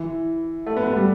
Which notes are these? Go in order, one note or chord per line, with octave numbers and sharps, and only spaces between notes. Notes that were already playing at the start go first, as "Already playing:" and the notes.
Already playing: E3
A3
B3
B3
G3